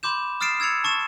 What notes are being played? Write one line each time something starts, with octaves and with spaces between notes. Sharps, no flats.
B5 C6 D6 G6 E7
D#6 F6 A6 C7 D7 E7
E6 G#6 A6 C#7 F7
A5 C#6 A6 E7